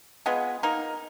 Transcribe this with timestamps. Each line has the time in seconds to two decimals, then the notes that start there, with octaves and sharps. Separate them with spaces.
0.26 G#3 B3 F4 G#4
0.63 A#3 D#4 A#4